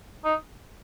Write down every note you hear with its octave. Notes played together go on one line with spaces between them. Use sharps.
D#4